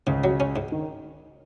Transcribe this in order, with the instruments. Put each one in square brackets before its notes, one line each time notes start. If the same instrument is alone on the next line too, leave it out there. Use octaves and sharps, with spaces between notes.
[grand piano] C#2 C#3 [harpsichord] G#2
[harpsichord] F#3
C#4
G#2
[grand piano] D#3